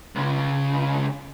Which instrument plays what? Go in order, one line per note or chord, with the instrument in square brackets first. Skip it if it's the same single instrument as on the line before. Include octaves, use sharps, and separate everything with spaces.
[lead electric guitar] C#2 C#3